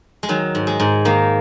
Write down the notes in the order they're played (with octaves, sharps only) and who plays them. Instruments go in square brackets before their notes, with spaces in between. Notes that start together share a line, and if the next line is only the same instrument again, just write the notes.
[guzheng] G#3
D#3 F#3
G#2
G#3
G#2
D#3 A#3